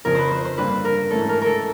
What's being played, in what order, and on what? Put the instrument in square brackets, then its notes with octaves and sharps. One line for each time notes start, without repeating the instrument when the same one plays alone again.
[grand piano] F2 C#3 F3 [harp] A#4
[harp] B4 C5
C5
C5
[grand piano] G2 D3 G3 A#3 [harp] B4
[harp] A#4
[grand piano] G#2 E3 A3 C#4 [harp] A4
[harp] A#4
A4 A#4